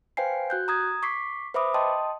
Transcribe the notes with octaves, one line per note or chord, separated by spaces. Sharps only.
B4 C5 F5 G5 G#5 C7
F#4 F#6 G6
A#5 D#6 G#6
C#6 D6 B6 C7
B4 C5 E5 B5 D6 D#6
D#5 G5 A5 C6 D#6